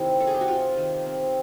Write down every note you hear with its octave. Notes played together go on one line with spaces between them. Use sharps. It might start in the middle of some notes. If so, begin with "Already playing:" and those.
Already playing: C3 D#3 C4 E4
G3 A4
G#4
G4
F#4
C3 F4
D#3
C4